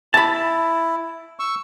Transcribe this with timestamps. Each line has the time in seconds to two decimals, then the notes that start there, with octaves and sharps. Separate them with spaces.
0.14 E4 A5 B5
1.39 C#6 E6